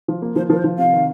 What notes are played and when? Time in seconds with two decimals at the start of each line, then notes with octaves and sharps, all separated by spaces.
0.08 F3
0.22 A#3
0.36 F3 C5
0.50 F3 A#4
0.57 C5
0.64 F3
0.78 C3 F5
0.93 D#3